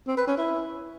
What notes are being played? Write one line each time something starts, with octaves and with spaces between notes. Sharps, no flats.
C4
B4
C#4
E4